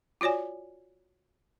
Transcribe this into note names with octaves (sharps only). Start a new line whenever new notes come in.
F4 F#4 C#5 D5 G#5